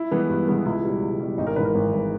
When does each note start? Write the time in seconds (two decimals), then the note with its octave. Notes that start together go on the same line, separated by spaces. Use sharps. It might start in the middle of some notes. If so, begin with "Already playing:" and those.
Already playing: E4
0.11 E3 G#3 B3
0.29 G2
0.48 E3 G#3 B3
0.65 C#2 E4
0.84 B2 G3
1.02 C#2
1.20 B2 G3
1.38 G#1 D#4
1.47 A#4
1.56 G#2 E3 B4
1.65 A#4
1.74 G#1
1.93 G#2 E3